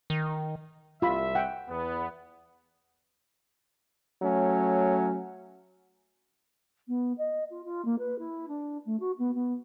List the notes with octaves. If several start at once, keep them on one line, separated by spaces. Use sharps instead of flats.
D#3
C2 F4 E5 B5
F#5 G5
E2 B3
F#3 A3 C#4
B3
D#5
F4
F4
A#3
B4
E4
D4
A3
F#4
B3
B3